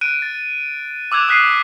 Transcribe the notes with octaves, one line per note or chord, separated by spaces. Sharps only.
F#6 D7 D#7
A6
D6 E6 F#6 G#6 E7 F7
D#6 F#6 B6 C7 D#7